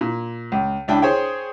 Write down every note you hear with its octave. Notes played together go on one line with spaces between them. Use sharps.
A#2
C#2
C#2 D4 E4 G5
G#4 C5 C#5 G5